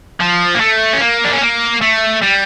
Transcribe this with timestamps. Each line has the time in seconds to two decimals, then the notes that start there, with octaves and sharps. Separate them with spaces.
0.20 F3
0.55 A#3
0.61 A3
0.93 C#4
1.00 A#3
1.24 D4
1.33 C#4
1.41 A#3
1.81 A3
2.22 G3